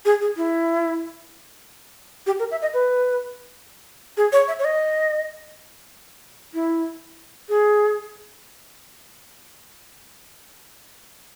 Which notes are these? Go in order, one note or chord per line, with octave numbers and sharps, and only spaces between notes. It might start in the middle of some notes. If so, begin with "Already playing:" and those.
G#4
G#4
E4
G4
A#4
E5
D#5
B4
G#4
C#5
E5
C#5
D#5
E4
G#4